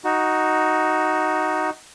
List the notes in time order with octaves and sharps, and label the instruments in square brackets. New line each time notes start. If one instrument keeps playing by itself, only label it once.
[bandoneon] D#4 F#4